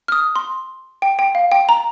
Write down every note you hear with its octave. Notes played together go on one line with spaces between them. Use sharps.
F6
D#6
C6
G5
G5
F5
G5
A#5